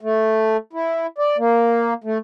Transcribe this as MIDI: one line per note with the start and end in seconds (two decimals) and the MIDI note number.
0.01 0.57 57
0.73 1.07 64
1.18 1.37 74
1.38 1.94 58
2.04 2.18 57